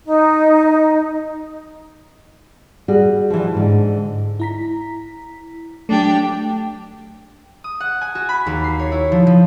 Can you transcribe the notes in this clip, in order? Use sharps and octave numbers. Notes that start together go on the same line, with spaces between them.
D#4
G3 F#4 G#4
E3 F3
G#2 D3
E4 A#5 B6
F#3 A3 D4 G4
D#6
F#5
G#5
F#4
B5
D#2
C7
C#5
E4
F3
F3